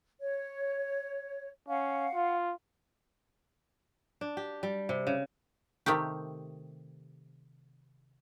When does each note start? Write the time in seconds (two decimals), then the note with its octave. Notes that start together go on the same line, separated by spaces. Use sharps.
0.20 C#5
1.69 C#4 F5 F#5
2.14 F4
4.21 D4
4.37 G4
4.63 G3
4.89 C3
5.07 C#3
5.86 C3 D#3 A3 G4